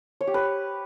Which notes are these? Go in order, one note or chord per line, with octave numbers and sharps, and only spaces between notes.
C#5
G4
B4